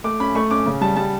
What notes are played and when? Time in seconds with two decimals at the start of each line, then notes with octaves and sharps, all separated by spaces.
0.04 A3 D6
0.20 C#4 B5
0.35 A3 C#6
0.51 C#4 D6
0.66 C#3
0.81 G3 A5
0.96 G3 A5